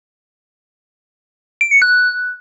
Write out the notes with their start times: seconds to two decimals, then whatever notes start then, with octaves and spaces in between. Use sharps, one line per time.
1.61 D7
1.71 C#7
1.82 F#6